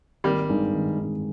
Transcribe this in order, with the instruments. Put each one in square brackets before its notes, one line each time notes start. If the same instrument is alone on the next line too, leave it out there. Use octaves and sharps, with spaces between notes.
[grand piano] G#1 [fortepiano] G3 A#3
[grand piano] G2 D#3 G#3 D#4
G#1
G2 D#3 G#3 D#4